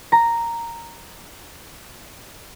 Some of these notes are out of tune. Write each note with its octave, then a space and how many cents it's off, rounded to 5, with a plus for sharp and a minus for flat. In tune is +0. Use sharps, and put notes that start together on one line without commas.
A#5 -5